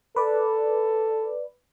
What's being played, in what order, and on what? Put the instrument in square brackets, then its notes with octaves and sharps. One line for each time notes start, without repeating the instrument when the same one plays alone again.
[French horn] A4 [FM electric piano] B4 D5